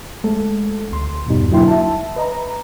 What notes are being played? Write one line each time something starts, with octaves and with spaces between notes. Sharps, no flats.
G#3 A3 A4
D2 C6
E2 G2 B2 G3 D#4
D3 F#3 A#3 E4 G5 C6
E5 A5
B4 D#5 A#5